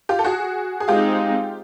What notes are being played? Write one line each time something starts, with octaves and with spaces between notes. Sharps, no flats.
F4 G4
A4
F#4 G#4
G#4
G#3 C4 D#4 F4 G4